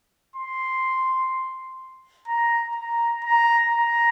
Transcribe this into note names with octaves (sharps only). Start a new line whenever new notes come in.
C6
A#5
A#5
A#5
A#5